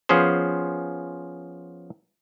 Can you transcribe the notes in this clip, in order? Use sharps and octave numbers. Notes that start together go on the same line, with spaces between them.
F3 B3 C#4 G#4 C5